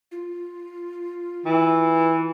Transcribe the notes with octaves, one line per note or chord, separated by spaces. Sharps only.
F4
E3